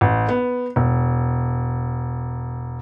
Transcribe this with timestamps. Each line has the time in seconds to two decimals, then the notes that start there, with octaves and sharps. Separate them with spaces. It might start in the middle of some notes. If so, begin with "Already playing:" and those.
0.01 A1
0.28 B3
0.76 E1